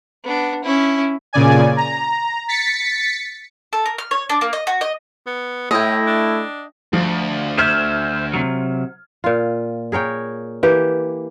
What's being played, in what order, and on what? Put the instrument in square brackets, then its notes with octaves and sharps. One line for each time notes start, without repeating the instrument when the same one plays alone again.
[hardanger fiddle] B3 D4
C#4 E4
[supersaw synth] A#2 C#3 D5 G#5
A#5
A6 B6 C#7
[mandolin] A4
A#4
F6
C#5
D4
A#3
D#5
F#4
D#5
[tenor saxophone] B3
[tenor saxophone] A2 [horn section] A3 E4 [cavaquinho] D#5 G5
[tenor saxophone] D4
[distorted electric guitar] D2 [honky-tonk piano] F3
[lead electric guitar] C5 E5 [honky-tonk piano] F6 G#6
[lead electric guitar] C3 F#3
[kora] A#2 F4
G#4 A#4 C#5 G5
E3 A#3 G4